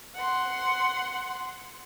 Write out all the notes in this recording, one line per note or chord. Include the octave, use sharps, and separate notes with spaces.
F#5 C6